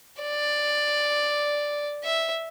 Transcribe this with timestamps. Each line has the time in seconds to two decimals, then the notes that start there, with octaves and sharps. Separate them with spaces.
0.22 D5
2.03 E5